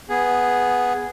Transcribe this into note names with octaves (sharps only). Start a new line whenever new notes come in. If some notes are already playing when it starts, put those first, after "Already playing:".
B3 G#4